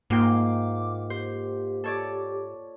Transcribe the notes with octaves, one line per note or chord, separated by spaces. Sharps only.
G#2 A#3 F4 G5 D6
G4 C5
A4 C#5 D5